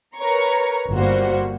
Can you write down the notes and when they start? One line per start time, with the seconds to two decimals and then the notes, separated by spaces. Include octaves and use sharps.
0.17 A#4 B4 C#5 A#5 C#6
0.92 G1 G3 A#3 F#4 C5